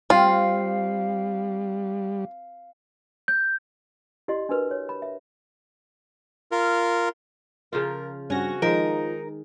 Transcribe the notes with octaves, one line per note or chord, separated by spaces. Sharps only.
G3 C4 F4 F5
G6
E4 G4 D5 D#5 C6
D4 F#4 A#4 B4
C#5
B5
E5
F4 A#4
C#3 F3 F4 A#4
G2 C4 C#4 F#4 A#6
D#3 F3 G#3 D#4 A#4